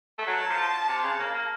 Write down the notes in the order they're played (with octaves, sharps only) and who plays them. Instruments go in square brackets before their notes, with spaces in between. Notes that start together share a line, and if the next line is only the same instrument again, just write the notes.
[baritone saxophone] A3
[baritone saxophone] F#3 [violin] A5
[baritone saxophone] F3
C3
C#3
A#3
A#3